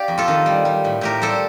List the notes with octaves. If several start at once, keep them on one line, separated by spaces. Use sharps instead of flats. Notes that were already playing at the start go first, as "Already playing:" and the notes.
Already playing: G4 D5 F5
F2
F4 A4
D#3
G3
G3
A2
A2 G4 A#4
G3 A4 C5